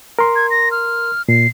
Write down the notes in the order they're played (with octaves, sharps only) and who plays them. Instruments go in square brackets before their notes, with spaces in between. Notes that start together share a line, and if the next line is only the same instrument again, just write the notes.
[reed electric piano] A#4 C6
[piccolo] G#6
A#6
F6
[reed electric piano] A#2 [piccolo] C7